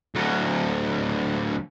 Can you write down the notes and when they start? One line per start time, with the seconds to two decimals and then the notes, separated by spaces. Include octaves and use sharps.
0.15 D2 F#3